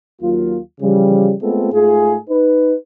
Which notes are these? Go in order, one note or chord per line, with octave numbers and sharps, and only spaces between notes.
D#2 F#3 A#3 F4
C#3 E3 F3 G3
G#3 A3 B3 C4 F4 A4
G#2 A3 F4 G#4
D#4 B4